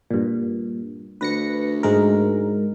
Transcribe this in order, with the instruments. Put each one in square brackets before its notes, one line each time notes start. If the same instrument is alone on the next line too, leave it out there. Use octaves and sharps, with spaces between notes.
[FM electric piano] G2 A#2
[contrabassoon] D2 [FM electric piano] B4 A#6 C#7
[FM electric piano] G#2 G#3 A#4